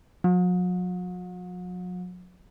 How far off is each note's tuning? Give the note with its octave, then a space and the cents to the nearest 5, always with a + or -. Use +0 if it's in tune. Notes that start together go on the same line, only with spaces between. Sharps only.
F#3 -45